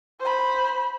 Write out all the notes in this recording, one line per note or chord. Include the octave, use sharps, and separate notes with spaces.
C5 B5